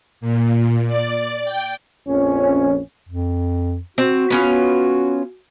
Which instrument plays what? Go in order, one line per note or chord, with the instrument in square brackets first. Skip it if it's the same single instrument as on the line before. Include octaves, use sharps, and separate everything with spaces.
[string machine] A#2
D5
G5
[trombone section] A#1 F2 C#4
[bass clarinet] F2
[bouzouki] C4 [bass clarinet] F#4
[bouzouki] B3 C#4 F4